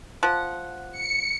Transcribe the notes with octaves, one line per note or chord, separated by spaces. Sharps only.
F3 F#5
C#7